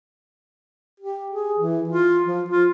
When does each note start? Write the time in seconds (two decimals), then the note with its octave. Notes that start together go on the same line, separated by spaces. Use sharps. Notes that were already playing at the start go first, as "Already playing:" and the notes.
1.00 G4
1.32 G#4
1.58 E3
1.89 F4
2.26 F3
2.50 F4